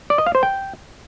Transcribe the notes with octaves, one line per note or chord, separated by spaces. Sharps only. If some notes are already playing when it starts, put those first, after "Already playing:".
D5
D#5
F5
C5
G5